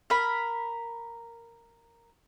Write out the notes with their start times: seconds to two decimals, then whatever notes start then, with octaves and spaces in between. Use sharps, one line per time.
0.10 A#4 B5